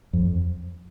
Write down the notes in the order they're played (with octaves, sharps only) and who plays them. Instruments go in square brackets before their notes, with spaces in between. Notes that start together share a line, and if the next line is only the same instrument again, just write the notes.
[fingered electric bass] F2